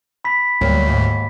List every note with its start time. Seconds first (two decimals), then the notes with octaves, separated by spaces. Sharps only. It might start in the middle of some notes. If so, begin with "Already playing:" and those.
0.24 B5 B6
0.61 D2 F#3 G3 A#3
0.88 D#2 G#2